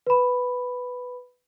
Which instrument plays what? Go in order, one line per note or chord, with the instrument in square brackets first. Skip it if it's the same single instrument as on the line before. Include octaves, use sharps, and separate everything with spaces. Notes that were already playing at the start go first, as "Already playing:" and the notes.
[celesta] B4 B5